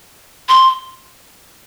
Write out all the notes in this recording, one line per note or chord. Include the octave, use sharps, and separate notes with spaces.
C6